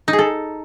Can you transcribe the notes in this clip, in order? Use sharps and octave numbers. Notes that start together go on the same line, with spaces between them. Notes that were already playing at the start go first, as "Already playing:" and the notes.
D#4
G#4
A4